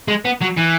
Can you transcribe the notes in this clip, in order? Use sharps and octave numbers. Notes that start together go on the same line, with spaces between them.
G#3
B3
F#3
E3